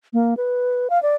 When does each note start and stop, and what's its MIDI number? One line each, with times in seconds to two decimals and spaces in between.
0.13 0.34 58
0.37 0.88 71
0.90 1.01 77
1.02 1.15 74